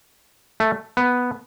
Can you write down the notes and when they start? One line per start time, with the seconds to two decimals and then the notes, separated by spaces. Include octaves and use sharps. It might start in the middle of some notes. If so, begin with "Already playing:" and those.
0.60 A3
0.97 B3